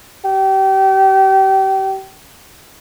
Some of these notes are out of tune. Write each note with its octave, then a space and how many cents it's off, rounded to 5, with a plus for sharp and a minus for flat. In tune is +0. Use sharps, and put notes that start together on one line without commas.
G4 -30